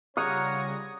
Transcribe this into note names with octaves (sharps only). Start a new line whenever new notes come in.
C#3 G3 F4 C#5 F#5 A#5 D#6 A#6